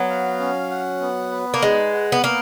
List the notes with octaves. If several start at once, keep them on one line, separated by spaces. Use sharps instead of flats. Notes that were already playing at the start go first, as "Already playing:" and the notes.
Already playing: F#3 B3
F5
C#4
F#5
B3
B4
A#3
G#3 D#4
F#5
B3
A#3 B3